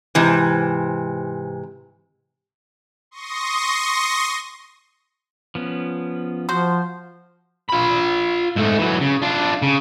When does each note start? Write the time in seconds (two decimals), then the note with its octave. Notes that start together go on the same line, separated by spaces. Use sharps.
0.15 G#2 C3 E3
3.11 C6 C#6 D#6 A#6
5.55 F3 B3 C#4
6.49 F3 F#4 C5
7.70 F4 B5
8.56 G#2 A3
8.79 E3 F#3
9.01 C#3
9.22 D4 F4
9.62 C#3